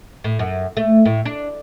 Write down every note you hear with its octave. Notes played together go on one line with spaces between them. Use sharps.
A2
F#2
A3
A2
D4